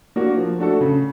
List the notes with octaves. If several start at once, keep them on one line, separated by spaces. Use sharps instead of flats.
A#3 D4 F#4
F3
A3 D4 F#4 A4
C#3